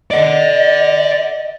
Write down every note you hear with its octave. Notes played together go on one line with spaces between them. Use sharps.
D5 D#5 F#5